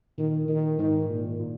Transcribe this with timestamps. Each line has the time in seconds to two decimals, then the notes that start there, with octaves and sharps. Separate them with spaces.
0.18 A#2 D#3
0.48 D#3
0.79 G#2 D#3
1.09 A#2
1.40 A#2